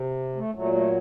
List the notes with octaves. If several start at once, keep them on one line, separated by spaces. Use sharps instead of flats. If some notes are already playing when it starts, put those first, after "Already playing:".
Already playing: C3
A3
A#2 F#3 A3
A3